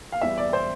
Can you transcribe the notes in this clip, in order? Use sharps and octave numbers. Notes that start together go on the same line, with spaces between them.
F5
E2 E3 G3 E5
D5
C5